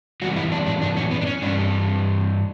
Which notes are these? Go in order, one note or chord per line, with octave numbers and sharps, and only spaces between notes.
F#2 E3 G3 F#4
E4
D4
D4
D4
C#4
B3
D4
C#4
G2 E3 G3 D4